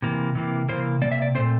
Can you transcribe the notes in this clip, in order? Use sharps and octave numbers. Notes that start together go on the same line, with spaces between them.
C3 E3 A#3
C3 E3 A#3
C3 E3 A#3 C5
C3 E3 A#3 D5
E5
D5
A#2 A3 C4 C5